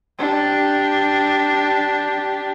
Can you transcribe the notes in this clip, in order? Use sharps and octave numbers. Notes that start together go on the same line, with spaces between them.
D4 G4